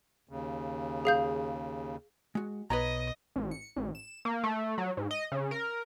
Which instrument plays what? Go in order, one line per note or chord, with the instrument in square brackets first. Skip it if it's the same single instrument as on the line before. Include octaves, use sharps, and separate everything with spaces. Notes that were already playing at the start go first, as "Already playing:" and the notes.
[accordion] D#2 C#3
[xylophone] G#4 F5 G6
[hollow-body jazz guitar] G#3 F#4
[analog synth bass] B1 [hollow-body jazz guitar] B4 C#5 A#5 [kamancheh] D#5
[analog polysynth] A1
C#7
A1
E7
A#3
A3
F#3
G#2
D#5
C#3
A#4